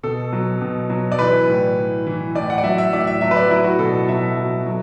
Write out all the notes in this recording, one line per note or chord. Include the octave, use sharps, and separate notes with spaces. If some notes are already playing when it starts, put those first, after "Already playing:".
B2 A4
F#3
B2
F#3
D5
E3 B4
A2
E3
E3
A2 D5
F#5
D5
F#3 E5
E5
A2 D5
E5
F#3 E5
B4
D5
F#3 E4
F#4
B2 A4
A4
F#3 E5
F#3
F#3